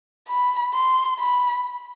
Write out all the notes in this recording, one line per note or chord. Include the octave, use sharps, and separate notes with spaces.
B5
C6
B5